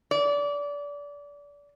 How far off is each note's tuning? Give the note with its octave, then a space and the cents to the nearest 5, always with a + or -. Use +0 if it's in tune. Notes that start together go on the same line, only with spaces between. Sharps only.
D5 -25